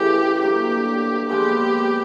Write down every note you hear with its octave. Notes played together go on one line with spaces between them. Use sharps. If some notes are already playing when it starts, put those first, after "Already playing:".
Already playing: C#3 E3 A3 G4
G2 D3 F#3 A#3 G4
A#2 F3 G#3 B3 G4